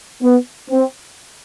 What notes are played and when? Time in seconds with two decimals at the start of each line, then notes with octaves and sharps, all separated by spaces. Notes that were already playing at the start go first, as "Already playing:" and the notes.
0.22 B3
0.70 C4